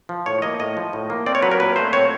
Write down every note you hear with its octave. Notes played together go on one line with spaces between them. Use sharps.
F3
A2 C#5
A#3 D#5
A2 D#5
F3
A2
A#3
C4 D5
C#5
F#3 B4
A#4
A#2 B4
A3 C5
C4 C#5